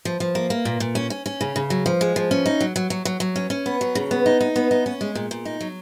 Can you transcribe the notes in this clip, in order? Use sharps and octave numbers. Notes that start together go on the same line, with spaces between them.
F3
F3
A#3
A#3
A#2
A#2
C#4
C#4
C#4
C#3
C#3
F#3
F3
G#3
F3
C#4
D#4
F#3
F#3
F#3
F#3
F#3
C#4
C#4
B3
F#3
C#3
B3
D#4
D#4
B3
D#4
C#4
G#3
A#2
A#2
D#4
F#3